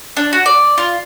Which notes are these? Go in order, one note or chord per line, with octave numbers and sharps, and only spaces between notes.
D4
F#4
D5
F4